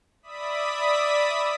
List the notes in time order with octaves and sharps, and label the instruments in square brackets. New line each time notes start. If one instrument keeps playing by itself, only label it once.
[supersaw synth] D5 E5 B5 D#6 B6